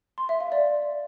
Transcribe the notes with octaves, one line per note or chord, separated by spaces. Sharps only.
C6
E5
F5
D5